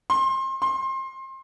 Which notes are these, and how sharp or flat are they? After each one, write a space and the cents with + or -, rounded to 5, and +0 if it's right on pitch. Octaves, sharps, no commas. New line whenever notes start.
C6 +30
C6 +25